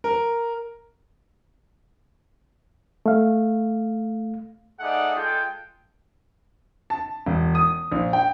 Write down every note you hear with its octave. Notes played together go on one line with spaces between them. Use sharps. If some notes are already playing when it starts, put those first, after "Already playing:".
A#4
A3 F5
A3 D#4 G#4 D5 F#5
G#3 F4 A4 G5
A5
E1
D#6
A#1
G5